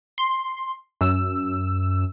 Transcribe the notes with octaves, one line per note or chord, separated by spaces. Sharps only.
C6
F#2 E6